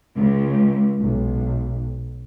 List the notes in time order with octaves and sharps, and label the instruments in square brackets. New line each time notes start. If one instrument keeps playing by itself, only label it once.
[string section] C#2
B1